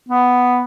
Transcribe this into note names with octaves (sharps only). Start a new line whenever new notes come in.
B3